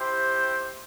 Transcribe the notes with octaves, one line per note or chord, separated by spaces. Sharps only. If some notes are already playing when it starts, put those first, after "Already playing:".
Already playing: E4 G4 C5 G5